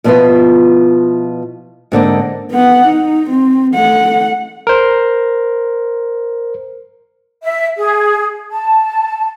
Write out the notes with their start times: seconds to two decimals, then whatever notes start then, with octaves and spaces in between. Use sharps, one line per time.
0.04 B2 F3 B3 E4 F4 B4
1.92 G#2 D3 A#3 C4
2.51 B3 F#5
2.86 D#4
3.30 C4
3.75 A3 F#5
4.67 A#4 C5
7.43 E5
7.76 G#4
8.50 A5